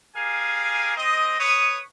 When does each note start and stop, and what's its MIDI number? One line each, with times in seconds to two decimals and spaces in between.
0.16 0.94 67
0.16 0.94 68
0.16 0.94 70
0.16 0.94 77
0.16 0.94 80
0.97 1.38 60
0.97 1.38 75
1.39 1.79 71
1.39 1.79 73
1.39 1.79 85
1.39 1.79 87